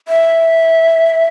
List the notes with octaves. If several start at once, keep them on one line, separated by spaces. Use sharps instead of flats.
E5